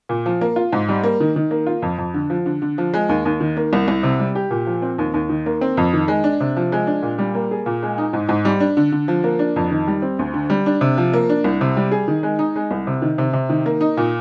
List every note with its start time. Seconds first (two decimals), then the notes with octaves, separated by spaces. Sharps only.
0.09 A#2
0.26 F3
0.41 A#3
0.56 F4
0.73 G#2
0.89 G3
1.03 A#3
1.20 D#3
1.36 D#3
1.51 A#3
1.67 F4
1.82 F2
1.98 F2
2.14 D3
2.30 F3
2.46 D3
2.62 D3
2.78 F3
2.94 G#3
3.09 D#2
3.25 D#2
3.40 D#3
3.57 A#3
3.73 C2
3.88 C2
4.03 C3
4.19 G3
4.35 G4
4.51 A#2
4.66 F3
4.82 C4
4.98 D#2
5.14 D#2
5.29 D#3
5.46 A#3
5.61 C4
5.77 F2
5.93 D#3
6.08 G#3
6.24 D4
6.40 C3
6.57 F3
6.72 G#3
6.87 D4
7.03 A#2
7.18 G3
7.35 A#3
7.51 G#4
7.66 A#2
7.83 G#3
7.98 D#4
8.13 G#2
8.29 G#2
8.45 G3
8.60 D4
8.77 D3
8.92 D3
9.08 F3
9.24 A#3
9.39 D4
9.56 F2
9.71 D#3
9.87 G3
10.02 C4
10.19 D2
10.34 D3
10.50 G3
10.66 D4
10.81 C3
10.98 F3
11.13 A#3
11.29 D4
11.44 C2
11.61 C3
11.77 G3
11.92 G#4
12.08 D#3
12.23 G#3
12.39 D#4
12.56 G#3
12.71 C2
12.87 C3
13.02 D#3
13.18 C3
13.33 C3
13.49 D#3
13.66 A#3
13.81 D#4
13.97 A#2